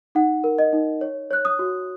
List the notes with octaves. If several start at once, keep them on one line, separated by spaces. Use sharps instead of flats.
D#4 F#5
A#4
D#5
D#4
C#5
C#5 F#6
D#6
F#4